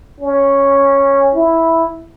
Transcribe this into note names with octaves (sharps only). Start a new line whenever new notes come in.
C#4
E4